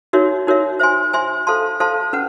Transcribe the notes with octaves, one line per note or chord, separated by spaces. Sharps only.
D#4 F#4 A#4 C#5 E5
D#4 F#4 A#4 C#5 E5
C5 E5 G#5 C6
C5 E5 G#5 C6
A4 C5 F5 A5 C6
A4 C5 F5 A5 C6
C#4 B4 F#5